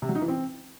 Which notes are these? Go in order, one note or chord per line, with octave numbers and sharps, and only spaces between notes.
C3
F#3
D#4
E3
C4